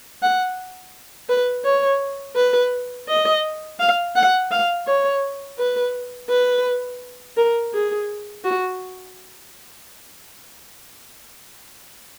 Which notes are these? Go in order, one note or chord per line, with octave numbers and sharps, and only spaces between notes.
F#5
B4
C#5
B4
D#5
F5
F#5
F5
C#5
B4
B4
A#4
G#4
F#4